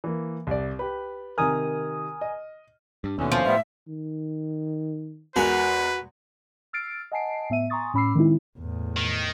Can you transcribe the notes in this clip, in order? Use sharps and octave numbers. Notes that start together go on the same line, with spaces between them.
E3 A#3
C2 D5
G4 B4
C3 D#3 A#4 G#5 D#6 F6
D#5
G2
D#2 B2 D3 E3 C#4
F3
A2 G3 B3 E5
D#3
E2 G#3 F#4 A#4 B4 F#5 G#5
E6 F6 A6 C7 D7
D#5 F#5 G#5 A5 C7 D7
A2 B3 E5 D#7
G#5 A#5 C6 C#6 D#6 A6
A2 C#4 B5 D6 E6 C7
D#3 G#3 C4 D#4 E4
E2 A2
D#3